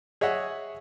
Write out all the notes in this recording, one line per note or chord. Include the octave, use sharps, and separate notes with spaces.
G#4 C#5 D#5 E5 F#5